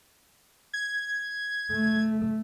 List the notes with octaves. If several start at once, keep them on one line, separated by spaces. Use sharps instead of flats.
G#6
A3